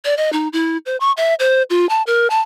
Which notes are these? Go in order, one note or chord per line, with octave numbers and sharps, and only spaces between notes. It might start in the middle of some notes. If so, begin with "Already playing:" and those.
D5
D#5
D#4
E4
C5
C#6
E5
C5
F4
A5
A#4
A5